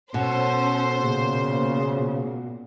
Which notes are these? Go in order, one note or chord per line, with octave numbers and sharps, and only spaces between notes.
B2 C#4 A4 C5
A#2 C#3